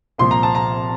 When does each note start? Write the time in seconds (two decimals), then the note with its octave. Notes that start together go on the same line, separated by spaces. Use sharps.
0.18 C2 A#2 F3 C6
0.31 A#5
0.43 A5
0.55 A#5